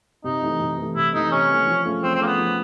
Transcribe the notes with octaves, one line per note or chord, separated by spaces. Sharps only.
C3 D#4
E3 A3
C3
E3 A3
C3 E4
E3 A3 D#4
C3 C#4
E3 A3
F3
A3 C#4 F4 G#4
F3 C4
C4
A3 A#3 C#4 F4 G#4
B3
F3